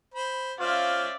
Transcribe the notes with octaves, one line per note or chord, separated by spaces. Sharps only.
C5 B5
C#4 F4 C5 D5 E5 F5